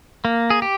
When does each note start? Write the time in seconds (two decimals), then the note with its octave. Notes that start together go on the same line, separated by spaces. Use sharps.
0.25 A#3
0.50 G#4
0.62 G4